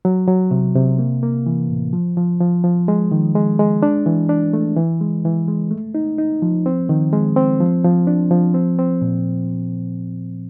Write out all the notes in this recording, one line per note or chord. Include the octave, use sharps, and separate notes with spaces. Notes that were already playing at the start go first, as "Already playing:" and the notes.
F#3
F#3
C3
C3
A#3
A#3
E3
A2
F3
F3
F3
F3
G#3
D#3
G#3
G#3
D4
E3
D4
A3
E3
G#3
E3
G#3
A3
D#4
D#4
F3
C4
D#3
G#3
C4
F3
F3
D4
F3
C4
C4
A#2